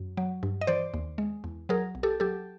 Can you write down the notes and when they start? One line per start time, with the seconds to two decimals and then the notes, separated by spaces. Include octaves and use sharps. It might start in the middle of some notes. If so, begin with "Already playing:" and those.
Already playing: F#2
0.17 F#3
0.43 G2
0.61 D#5
0.67 E3 C5 D5
0.94 D#2
1.18 G#3
1.44 E2
1.69 F#3 G#4 A#4
1.95 B1
2.03 G4 A4
2.20 F#3 G4 A4